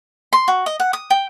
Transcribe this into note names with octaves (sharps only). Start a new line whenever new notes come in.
C6
F#4
D#5
F#5
D#6
G5